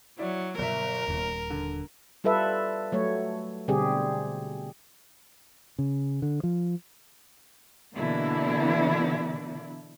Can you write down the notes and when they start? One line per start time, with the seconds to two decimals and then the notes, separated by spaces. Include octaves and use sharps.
0.19 F#3 E4 D5
0.58 G1 B2 F#3 A#4 E5
1.08 D#1 D#2
1.50 D3
2.24 G3 F4 A4 B4 E5
2.92 F#3 A3 C#5
3.68 B2 D3 G3 C4 G4 G#4
5.79 C#3
6.22 D3
6.43 F3
7.96 B2 D3 E3 A#3 D4 E4